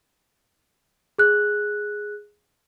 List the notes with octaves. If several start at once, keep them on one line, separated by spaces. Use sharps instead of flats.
G#4 F#6